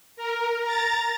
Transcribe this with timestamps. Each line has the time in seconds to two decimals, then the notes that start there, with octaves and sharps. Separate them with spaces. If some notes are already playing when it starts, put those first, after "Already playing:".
0.16 A#4
0.63 A#5 A6